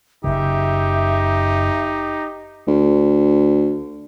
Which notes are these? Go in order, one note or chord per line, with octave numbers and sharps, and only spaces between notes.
F#1 C#3 D#4 G4 E5
D2